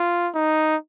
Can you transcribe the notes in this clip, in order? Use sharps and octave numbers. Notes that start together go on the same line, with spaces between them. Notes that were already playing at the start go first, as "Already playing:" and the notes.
Already playing: F4
D#4